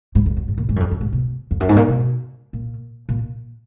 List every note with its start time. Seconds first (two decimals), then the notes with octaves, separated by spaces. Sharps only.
0.15 G#2
0.26 F2
0.37 F#2
0.48 G#2
0.58 A#2
0.69 G#2
0.76 F#2
0.80 F2
0.91 F#2
1.01 G#2
1.13 B2
1.51 F2
1.60 F#2
1.69 G#2
1.76 A#2
1.88 B2
2.53 A#2
3.09 A#2